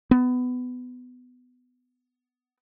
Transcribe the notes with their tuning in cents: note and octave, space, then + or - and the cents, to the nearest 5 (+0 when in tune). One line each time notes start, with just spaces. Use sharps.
B3 +20